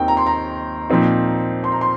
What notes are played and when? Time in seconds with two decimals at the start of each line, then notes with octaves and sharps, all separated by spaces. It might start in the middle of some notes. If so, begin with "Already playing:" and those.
Already playing: D#2 D#3 C4 D#4 G5
0.08 A#5
0.17 C6
0.27 A#5
0.90 A#2 F3 C4 D#4
1.64 C6
1.72 A#5
1.81 C6